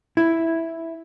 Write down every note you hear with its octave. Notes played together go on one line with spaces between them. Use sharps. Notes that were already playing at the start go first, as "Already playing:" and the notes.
E4